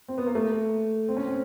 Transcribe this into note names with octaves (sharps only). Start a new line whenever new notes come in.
C4
B3
A#3
A3
C4
C#4
C4